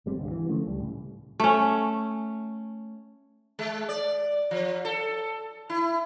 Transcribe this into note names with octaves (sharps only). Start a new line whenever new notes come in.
G#1 G3 C4
G#1 C#2 G2
E3
D3 F3 A3 C#4
C#2 G3
A2 C#3
A3 C#4
G#3
D5
F3
A4
E4